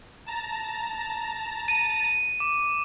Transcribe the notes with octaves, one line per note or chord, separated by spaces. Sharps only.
A5 A#5
D#7
D6